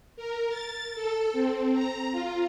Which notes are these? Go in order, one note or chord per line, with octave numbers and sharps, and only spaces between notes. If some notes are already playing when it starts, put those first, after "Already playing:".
A#4
A6
A4
C4
A#5
F4